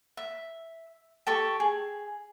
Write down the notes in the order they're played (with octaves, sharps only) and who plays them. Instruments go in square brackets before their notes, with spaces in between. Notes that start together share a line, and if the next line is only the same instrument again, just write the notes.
[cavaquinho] E5
G4 A4 C#6
G#4